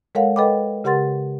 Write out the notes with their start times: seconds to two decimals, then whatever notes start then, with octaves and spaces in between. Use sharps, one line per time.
0.15 G#3 A4 A#4 C#5 F5 F#5
0.36 A4 B4 D#5 G5 B5 D6
0.84 C#3 G4 A#4 F#5 C6 A6